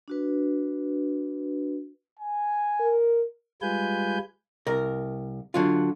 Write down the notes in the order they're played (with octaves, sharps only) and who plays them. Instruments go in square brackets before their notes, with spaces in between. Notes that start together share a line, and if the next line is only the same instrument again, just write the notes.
[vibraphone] D4 F#4 B4
[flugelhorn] G#5
[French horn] A#4
[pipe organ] G3 G#3 F4 B4 G#5 G6
[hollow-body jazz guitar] C2 A#4
D3 F#3 F4